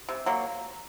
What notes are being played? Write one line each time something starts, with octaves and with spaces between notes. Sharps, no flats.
C3
F#3 A#3